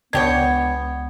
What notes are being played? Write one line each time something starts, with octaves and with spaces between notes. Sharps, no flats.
C#2 B3 D4 G4 C#5 G#6